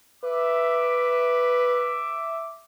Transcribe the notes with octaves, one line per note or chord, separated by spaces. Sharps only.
B4 E5 D6